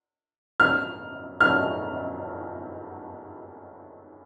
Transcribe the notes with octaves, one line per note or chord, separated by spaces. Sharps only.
F6
F6